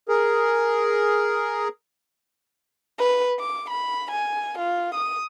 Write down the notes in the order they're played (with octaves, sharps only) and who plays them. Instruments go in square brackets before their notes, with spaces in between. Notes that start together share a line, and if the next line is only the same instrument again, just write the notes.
[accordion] G#4 A#4
[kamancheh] B4
D6
B5
G#5
F4
D#6